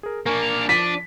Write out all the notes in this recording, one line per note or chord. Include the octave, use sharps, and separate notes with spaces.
G#4 A#4
A#3 D4 A#4 G#5 C#6
F7
F3 D4 B6 D#7